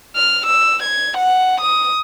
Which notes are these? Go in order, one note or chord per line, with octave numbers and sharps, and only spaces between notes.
F6
E6
G#6
F#5
D#6